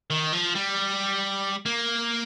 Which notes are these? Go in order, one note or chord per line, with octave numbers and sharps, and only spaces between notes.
D#3
F3
G3
A#3